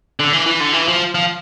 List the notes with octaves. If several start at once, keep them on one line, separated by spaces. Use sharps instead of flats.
D3
E3
E3
D3
E3
F3
F3